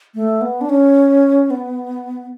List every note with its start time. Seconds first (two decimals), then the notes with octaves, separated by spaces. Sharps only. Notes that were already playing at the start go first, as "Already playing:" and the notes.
0.15 A3
0.41 B3
0.61 D4
0.69 C#4
1.50 B3